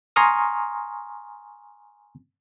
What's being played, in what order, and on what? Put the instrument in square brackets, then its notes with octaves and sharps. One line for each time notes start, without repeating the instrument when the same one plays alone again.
[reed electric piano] G#5 A#5 C6 C#6 D#6 F6